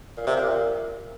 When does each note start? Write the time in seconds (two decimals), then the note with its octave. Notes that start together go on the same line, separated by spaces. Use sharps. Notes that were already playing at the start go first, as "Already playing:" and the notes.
0.17 A#2
0.27 C3
0.37 A#2